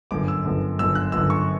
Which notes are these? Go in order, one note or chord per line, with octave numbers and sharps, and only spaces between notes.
G1 F#2 D3 D6
E6
G1 F#2 D3
G1 F#2 D3 E6
F#6
G1 F#2 D3 E6
C#6